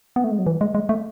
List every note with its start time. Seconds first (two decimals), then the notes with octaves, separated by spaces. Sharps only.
0.16 B3
0.24 A3
0.31 G#3
0.39 F#3
0.47 E3
0.61 G#3
0.75 G#3
0.89 A3